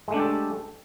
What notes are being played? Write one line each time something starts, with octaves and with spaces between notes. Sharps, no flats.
G#3 A3 D4 G4 A4